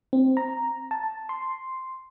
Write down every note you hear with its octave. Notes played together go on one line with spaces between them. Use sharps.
C4
A#5
A5
C6